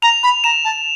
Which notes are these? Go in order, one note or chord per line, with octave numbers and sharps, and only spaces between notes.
A#5 F7
B5
A#5 E7
A5